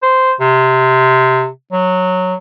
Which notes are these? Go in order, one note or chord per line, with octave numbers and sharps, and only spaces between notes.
C5
C3
F#3